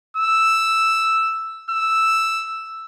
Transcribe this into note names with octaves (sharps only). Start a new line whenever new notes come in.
E6
E6